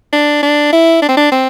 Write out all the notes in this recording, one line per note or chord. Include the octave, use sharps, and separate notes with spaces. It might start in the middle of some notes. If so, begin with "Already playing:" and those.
D4
D4
E4
D4
C4
D4
C4